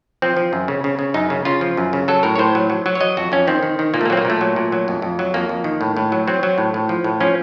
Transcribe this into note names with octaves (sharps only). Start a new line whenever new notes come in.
F3 C4
F3
F#2
C#3
C#3
C#3
F#2 D#4
C#3
C#3 F4
F3
F#2
C#3
F#3 A4
A2 A#4
C#5
A2 C5
F#3
F#3
F#3
C#5
F#3 D#5
F2 F#4
F2 C#4
D#3 C4
D#3
D#3
A#2 A#3
A3
A#3
F#3 C4
A#3
A#2 A3
F#3
A#2
F#3
F2
F2
F#3
F2 A#3
F2
D#3
A2
A2
F#3
F#3 C4
F#3
A2
A2
F3
A2
F3 C#4